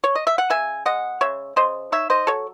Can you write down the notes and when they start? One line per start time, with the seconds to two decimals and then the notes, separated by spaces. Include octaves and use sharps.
0.04 C#5
0.15 D#5
0.27 E5
0.38 F#5
0.50 C#3 E5 G#5
0.86 G#3 D#5 F#5
1.21 C#3 C#5 E5
1.56 C#3 C5 D#5
1.92 D#4 C#5 E5
2.10 C5 D#5
2.27 F#3 A4 C#5